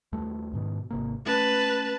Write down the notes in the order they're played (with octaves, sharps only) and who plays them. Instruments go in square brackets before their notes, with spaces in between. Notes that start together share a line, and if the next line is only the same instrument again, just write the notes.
[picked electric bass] D#2 G3 A3
G#2 B2 D#3
G#1 C3 A#3
[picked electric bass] A3 C#4 [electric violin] B4 A5